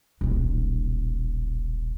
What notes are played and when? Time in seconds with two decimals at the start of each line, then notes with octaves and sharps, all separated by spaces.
0.21 D#1 B1